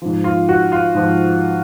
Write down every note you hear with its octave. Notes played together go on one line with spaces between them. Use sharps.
G#2 F3
F4
F#4
F4
G#2 F3